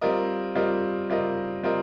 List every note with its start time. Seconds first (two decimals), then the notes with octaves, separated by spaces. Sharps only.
0.01 G3 C4 F4 A#4 D#5
0.55 G3 C4 F4 A#4 D#5
1.10 G3 C4 F4 A#4 D#5
1.64 G3 C4 F4 A#4 D#5